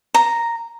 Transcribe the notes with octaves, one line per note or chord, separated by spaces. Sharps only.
A#5